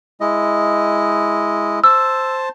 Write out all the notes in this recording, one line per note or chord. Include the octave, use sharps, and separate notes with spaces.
G#3 E4 D#5
C5 A5 E6